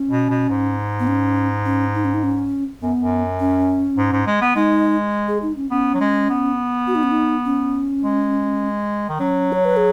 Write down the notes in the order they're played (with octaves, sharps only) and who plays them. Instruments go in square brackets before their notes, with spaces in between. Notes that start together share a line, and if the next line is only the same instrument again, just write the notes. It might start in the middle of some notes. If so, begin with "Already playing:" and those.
Already playing: [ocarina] C#4
[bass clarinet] B2
B2
G#2
[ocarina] B3
C#4
C#4
D#4
C#4
D#4
C#4
[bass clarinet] F#2 [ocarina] B3
[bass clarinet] F#2
[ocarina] C#4
[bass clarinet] G#2
G#2
G#3
B3
[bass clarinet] G#3 [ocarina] D#4
[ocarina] G#4
D#4
C#4
[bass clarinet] B3 [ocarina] C#4
[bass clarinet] F#3
G#3
B3
[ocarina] F#4
D#4
C#4
D#4
C#4
[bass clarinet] G#3
D#3
[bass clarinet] F#3 [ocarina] C#4
[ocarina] C#5
B4
G#4